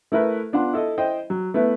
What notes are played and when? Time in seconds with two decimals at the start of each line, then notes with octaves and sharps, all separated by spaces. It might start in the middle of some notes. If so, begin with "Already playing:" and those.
0.12 A3 E4 A#4 B4
0.53 B3 D4 F4 F#5 C6
0.73 E4 A4 D#5
0.98 E4 C5 D#5 G5
1.30 F#3
1.54 A3 B3 E4 B4